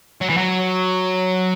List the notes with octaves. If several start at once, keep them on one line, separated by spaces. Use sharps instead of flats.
F#3
E3
F#3